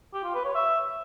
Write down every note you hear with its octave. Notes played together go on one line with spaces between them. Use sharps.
G4
F4
B4
C#5
E5